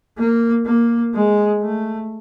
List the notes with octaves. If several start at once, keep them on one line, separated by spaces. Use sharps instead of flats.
A#3
A#3
G#3
A3